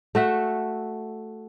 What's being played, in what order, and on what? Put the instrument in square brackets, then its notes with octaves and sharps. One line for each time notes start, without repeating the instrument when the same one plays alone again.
[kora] A3 F#4 E5 F#5